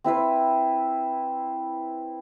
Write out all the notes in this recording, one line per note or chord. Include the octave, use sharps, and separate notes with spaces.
C4 E4 B4 C5